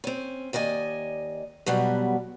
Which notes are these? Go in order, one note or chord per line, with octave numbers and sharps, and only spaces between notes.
C4 C#4
D#2 D5 D#5 G#5
B2 F#3 G3 B3